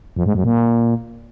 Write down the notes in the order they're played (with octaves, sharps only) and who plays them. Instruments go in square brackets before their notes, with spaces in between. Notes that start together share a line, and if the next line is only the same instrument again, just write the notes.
[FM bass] F2
G#2
F#2
A#2